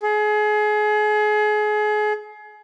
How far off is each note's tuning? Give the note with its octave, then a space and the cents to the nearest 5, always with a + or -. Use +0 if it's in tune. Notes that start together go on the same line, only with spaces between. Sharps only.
G#4 +30